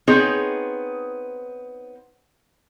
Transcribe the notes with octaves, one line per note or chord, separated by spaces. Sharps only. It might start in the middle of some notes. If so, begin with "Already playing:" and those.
B3 C4 D#4 G#4 C#5